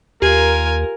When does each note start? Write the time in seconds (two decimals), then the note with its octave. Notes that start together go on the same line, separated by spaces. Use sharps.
0.22 D#2 F4 G4 A#4 G#5